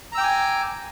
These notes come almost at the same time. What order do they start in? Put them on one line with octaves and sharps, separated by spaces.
A#5 E6 G5 D6 G#5